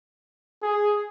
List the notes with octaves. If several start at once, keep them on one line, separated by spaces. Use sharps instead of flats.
G#4